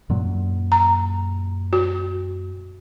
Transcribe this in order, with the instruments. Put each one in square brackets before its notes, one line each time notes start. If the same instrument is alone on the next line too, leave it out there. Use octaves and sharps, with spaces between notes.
[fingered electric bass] F#2 A#2 F#3
[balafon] A#5
F#4